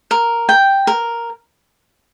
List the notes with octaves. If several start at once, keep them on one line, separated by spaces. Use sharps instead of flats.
A#4
G5
A#4